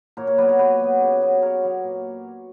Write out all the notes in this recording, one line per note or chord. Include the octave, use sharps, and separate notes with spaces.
A#2 A#4 C#5
A#4 C#5
F#3 B3 B4 D5
A#4 C#5
A#2 G4 B4
F#3 B3
C#3
F#3 B3
C#3 A#4 C#5
F#3 B3
A#2